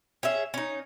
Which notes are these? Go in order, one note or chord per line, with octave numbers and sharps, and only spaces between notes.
C#4 G#4 E5
C#4 D#4